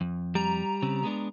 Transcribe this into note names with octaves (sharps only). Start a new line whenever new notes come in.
F2
G3 A#5
C#3 C4
G#3 B3 D4